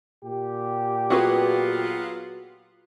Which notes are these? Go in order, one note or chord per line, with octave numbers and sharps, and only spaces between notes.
A#2 G4
F#3 B3 F4 F#4 G#4 B4